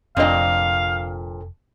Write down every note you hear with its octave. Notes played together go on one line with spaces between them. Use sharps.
F1 F2 A#2 C4 D4 D#5 F5